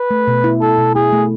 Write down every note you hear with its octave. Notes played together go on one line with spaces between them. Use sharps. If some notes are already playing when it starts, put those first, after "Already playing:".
Already playing: B4
A3
B2
E4
E4 A4
B2
E4 G#4
A3